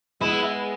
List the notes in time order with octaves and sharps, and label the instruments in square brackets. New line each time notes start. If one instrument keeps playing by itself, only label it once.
[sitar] G#3 B3 [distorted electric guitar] E4